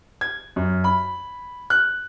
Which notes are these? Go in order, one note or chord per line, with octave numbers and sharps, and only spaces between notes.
G#6
F#2
B5
F#6